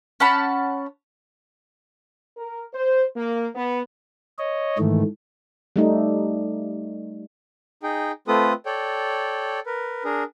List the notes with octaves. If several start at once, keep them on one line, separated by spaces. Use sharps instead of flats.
C#4 F#5 A5 B5
A#4
C5
A#3
B3
C#5 D#5
G#2 D#3 E3 A3
G3 A3 D#4
D#4 G#4 G5
A3 C4 F4 A4 B4 D#6
A4 C#5 D5 G5
A#4 B4
D4 G#4 A#4